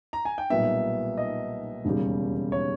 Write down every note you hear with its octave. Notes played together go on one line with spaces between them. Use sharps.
A#5
G#5
G5
B1 A#2 G3 B3 E5
D#5
E1 D#2 C#3 G3
C#5